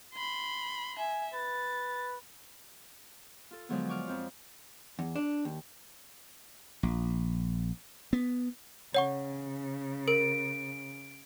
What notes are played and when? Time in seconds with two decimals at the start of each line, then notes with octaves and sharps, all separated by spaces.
0.13 B5 C6
0.98 E5 G#5
1.34 B4 A6
3.51 F4 A4
3.69 D3 F3 F#3 G#3 B3
3.89 C#6 D6 F6
4.07 F2 C4 F4
4.99 E2
5.16 D4
5.45 D#2
6.83 A#1
8.13 B3
8.94 C#3 C#5 F#5 C#6
10.08 A#4 D7